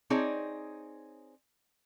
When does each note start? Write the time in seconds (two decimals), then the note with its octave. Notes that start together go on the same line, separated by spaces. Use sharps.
0.10 C4 D#4 G#4 C#5 D5